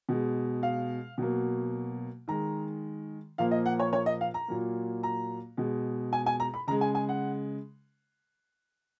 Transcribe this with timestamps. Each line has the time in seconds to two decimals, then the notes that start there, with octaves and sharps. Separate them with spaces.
0.09 B2 G#3
0.63 F5
1.18 B2 F#3 A#3
2.28 D#3 G#3 A#5
3.38 A#2 F3 A#3 F5
3.51 D#5
3.66 F#5
3.80 C#5
3.93 C#5
4.06 D#5
4.21 F5
4.34 A#5
4.48 A#2 F#3 A#3
5.03 A#5
5.57 B2 G#3
6.13 G#5
6.26 G#5
6.40 A#5
6.54 B5
6.67 C#3 A#5
6.71 G#3
6.81 G#5
6.95 G#5
7.09 F#5